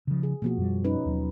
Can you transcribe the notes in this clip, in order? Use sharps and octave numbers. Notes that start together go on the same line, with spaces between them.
C#3 F3
G#4
B2 F3 A#3 F#4
F#2 G3
C#4 D#4 B4
D#2 F#3